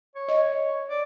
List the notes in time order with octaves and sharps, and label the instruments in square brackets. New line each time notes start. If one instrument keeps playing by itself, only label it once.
[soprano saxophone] C#5
[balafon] D#5
[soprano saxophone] D5